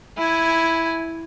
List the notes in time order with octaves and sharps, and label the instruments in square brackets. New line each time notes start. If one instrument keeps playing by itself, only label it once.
[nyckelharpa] E4 G#5